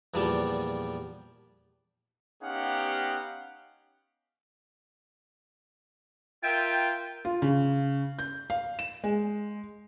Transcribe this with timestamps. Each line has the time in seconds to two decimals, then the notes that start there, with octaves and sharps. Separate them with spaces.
0.14 E2 A#2 F3 G3 A5
2.43 B3 C#4 D#4 G4 F5 F#5
6.43 F4 A#4 E5 G5
7.25 F4
7.42 C#3
8.19 G6
8.50 F5
8.79 E7
9.04 G#3